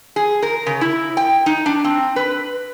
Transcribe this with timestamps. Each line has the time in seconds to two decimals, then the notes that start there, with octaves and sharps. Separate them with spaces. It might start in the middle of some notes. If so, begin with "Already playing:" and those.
0.16 G#4
0.42 A#4
0.66 C#3
0.81 E4
1.17 G5
1.46 D#4
1.66 D4
1.84 C4
2.16 B4